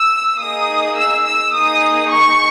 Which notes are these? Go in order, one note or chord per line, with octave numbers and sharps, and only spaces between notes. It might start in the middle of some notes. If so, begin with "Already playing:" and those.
Already playing: E6
A#3 D#4 G#4 D#6
E6
E6
A#3 D#4 G#4 D#6
C#6